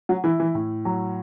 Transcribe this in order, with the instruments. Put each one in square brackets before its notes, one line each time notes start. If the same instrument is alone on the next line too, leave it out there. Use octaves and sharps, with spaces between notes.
[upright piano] F#3
[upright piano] E3 [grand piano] E4
[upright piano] E3
[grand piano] A2
F#3